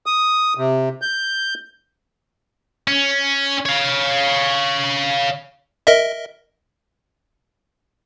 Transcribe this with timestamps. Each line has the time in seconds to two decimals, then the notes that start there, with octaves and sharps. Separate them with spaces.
0.06 D#6
0.58 C3
1.02 G6
2.88 C#4
3.66 C#5 F5
5.87 A#4 D#5 E5